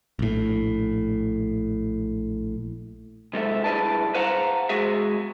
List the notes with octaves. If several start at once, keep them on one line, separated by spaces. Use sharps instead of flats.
A#1 A2
C3 G#3 A4 E5
G2 E4 G#4 B4 D5 A5
B4 C5 F5 F#5 A5 A#5
G#3 F#4 G#4 E5